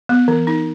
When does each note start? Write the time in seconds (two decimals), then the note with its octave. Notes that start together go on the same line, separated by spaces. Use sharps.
0.09 B3
0.28 E3
0.47 D#4